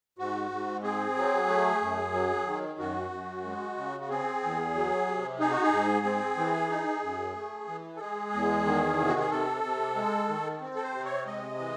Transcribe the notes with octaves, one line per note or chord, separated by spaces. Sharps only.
G#2 F#4
G#2
C4 G#4
F#3
A3
F#2
F#3
D#3
F#2 F#4
F#2
G#3
C#3
F#4
C4 G#4
E2
F#3
C3
D#4 G#4
F#4
G#4
G#2
C4
E3
D#4
F#2
A3
E3
A4
G#3 G#4
E2
D#3
C3
F#4
G#4
C3 A4
C3
G#3
D#3
C4
A4
C5
C3
C#5
G#3 D#5
E3